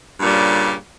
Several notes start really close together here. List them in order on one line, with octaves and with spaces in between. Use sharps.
G2 A#2 G3 C#3